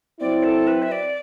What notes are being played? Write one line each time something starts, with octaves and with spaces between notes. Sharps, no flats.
F#3 C4 E4 D5
A4
B4
E5
D5